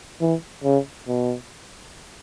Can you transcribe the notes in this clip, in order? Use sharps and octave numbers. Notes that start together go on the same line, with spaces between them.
E3
C#3
B2